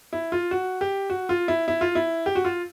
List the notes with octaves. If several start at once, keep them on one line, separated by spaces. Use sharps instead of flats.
E4
F4
F#4
G4
F#4
F4
E4
E4
F4
E4
G4
F#4
F4